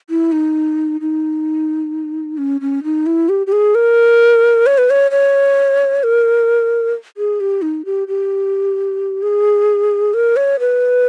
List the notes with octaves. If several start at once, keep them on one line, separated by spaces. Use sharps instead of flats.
E4
D#4
D#4
C#4
C#4
D#4
E4
G4
G4
G#4
A#4
C#5
B4
C#5
C#5
A#4
G#4
G4
D#4
G4
G4
G#4
A#4
C#5
B4